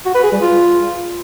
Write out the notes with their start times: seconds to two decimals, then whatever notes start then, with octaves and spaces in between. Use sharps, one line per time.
0.06 F#4
0.15 B4
0.23 G#4
0.32 G3
0.41 F4